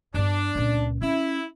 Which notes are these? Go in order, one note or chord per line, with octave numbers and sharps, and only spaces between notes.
G2 B3 D4
C#2 A#2
C#4 E4